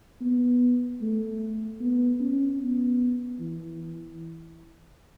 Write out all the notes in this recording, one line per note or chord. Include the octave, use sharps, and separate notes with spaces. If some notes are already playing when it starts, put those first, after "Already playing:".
B3
A3
B3
C#4
B3
E3